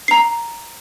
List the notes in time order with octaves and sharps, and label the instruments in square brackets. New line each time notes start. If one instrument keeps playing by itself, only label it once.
[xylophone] A#5 C7